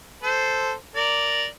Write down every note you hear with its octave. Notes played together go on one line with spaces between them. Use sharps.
A4 C5
A#4 D5